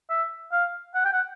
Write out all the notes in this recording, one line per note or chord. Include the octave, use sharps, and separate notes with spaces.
E5
F5
F#5
G5
F#5